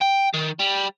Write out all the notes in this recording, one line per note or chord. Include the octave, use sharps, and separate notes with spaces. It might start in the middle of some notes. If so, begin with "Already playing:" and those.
G5
D#3
G3